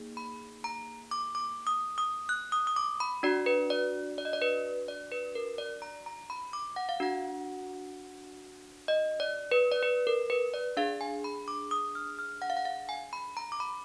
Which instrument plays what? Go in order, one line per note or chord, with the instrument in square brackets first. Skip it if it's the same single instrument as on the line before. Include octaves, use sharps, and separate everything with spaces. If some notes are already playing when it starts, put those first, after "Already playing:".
Already playing: [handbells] A#3 D#4 G#4
B5
A#5
D6
D6
D#6
D#6
F#6
D#6
D#6
D6
B5
D4 F#4 D5
B4
D5
D5
D#5
D5
B4
D5
B4
A#4
D5
A#5
A#5
B5
D6
F#5
F5
D4 F#4 F#5
D#5
D5
B4
D5
B4
A#4
B4
D5
D4 G#4 F5
G#5
B5
D6
D#6
F6
F6
F#5
F5
F#5
F5
G#5
B5
A#5
D6
B5